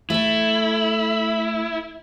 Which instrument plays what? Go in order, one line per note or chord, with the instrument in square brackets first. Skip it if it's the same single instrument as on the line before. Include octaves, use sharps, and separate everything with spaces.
[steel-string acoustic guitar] A3 A4 [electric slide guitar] E4